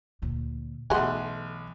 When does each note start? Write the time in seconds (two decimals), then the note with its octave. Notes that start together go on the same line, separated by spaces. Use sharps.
0.22 D2 A#2
0.90 B1 E3 A3 F#4 G#4 C6 F#6